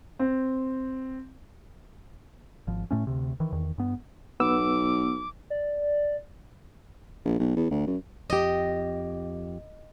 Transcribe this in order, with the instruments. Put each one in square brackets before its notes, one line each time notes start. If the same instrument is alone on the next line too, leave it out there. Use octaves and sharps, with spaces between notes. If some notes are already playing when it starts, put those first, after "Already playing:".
[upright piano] C4
[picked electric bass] G#1 F3
A2 A3 C#4
D2 C3
D#3 E3
E2 D#3
G2 B3
[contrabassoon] B1 [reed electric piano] B3 E6 [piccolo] D6
[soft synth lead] D5
[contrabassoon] A#1
B1
E2
D2
F#2
[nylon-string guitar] F2 G4 [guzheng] D#5